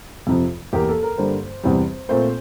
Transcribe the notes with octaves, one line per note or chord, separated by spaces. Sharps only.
F2 C3 F3
E2 E3 A#3 G4
A4
A#4
G2 D3 G3 A#3 C5
E2 C3 G3 C4
A#2 A3 C4 C5